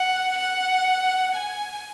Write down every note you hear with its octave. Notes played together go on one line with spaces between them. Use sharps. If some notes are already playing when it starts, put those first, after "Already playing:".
Already playing: F#5
F#5
G#5